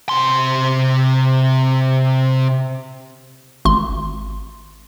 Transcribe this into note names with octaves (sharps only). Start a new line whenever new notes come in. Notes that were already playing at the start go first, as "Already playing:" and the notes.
C3 C6
G#1 C6